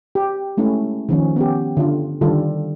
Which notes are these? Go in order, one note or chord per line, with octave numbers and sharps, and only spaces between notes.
G4
G#3 A3 C#4 E4
D#3 F3 C#4
B3 C#4 G4
D3 F4
D3 D#3 G3 F4 A4